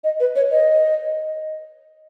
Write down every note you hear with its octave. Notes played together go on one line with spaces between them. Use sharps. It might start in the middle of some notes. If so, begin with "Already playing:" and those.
D#5
B4
C#5
D#5